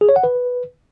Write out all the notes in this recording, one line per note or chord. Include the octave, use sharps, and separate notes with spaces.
G#4
C#5
F#5
B4